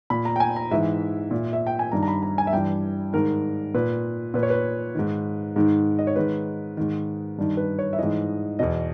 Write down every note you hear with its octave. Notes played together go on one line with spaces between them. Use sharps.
A#2 B5
A#5
G5
G#5
A#5
G#2 E3 E5
A#2
E5
G5
G#5
G2 D#3 A#5
A#5
B5
A#5
G#5
E5
G2 E3 G5
G#2 D#3 A#4
A#2 B4
A#2 B4
C#5
B4
G#2 D#3
G#2 D#3
D#5
C#5
G#2 D#3 B4
G#2 D#3
G2 D#3
B4
C#5
E5
G#2 E3 D#5
E2 B2 D#5